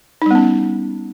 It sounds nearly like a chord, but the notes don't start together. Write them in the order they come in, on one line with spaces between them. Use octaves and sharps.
D#4 G3 B3 C#4